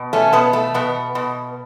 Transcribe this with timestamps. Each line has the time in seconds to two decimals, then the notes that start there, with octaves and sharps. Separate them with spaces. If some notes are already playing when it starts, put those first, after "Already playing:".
Already playing: B2
0.13 A3 C#4
0.33 B2 B3
0.53 A3
0.74 B2 B3
1.15 B2